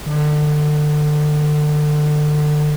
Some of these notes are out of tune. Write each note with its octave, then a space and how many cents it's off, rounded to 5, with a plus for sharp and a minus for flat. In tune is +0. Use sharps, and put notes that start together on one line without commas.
D3 +30